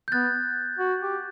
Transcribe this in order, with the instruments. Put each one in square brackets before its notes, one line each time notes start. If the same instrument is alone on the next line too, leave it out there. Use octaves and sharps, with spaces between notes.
[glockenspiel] G6
[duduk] B3 [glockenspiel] F#6 A6
[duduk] F#4
G4